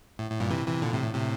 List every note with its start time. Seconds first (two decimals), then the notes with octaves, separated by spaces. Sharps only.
0.19 A2
0.30 A2
0.40 G2 A#2
0.50 C3 E3
0.66 C3 E3
0.82 A#2 D3
0.93 A2 C3
1.03 A2
1.14 A2 C3